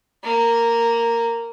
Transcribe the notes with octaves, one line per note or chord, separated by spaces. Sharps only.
A#3